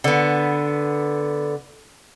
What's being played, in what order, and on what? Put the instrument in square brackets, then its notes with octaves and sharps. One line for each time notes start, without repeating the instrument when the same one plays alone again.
[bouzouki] D3 B3